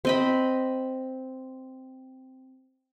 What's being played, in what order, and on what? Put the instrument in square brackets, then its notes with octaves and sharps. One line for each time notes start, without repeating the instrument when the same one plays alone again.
[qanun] C4 D#5 B5